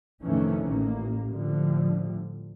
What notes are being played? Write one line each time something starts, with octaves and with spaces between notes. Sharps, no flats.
F2 C3 D#3 E3 A3 C#4
A1 A#3
A2 D3 F3 G3